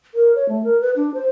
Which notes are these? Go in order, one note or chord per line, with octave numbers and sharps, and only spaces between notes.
A#4
C#5
A3
A#4
B4
D4
C5